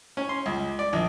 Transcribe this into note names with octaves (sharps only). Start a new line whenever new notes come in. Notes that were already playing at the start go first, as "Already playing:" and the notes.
C#4
C6
C#2
D5
A#1